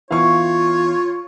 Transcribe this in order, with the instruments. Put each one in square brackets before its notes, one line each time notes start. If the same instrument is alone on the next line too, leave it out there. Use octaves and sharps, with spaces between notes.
[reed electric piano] E3 B3 E4 [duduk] F4 [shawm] C#5 [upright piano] F5 C#6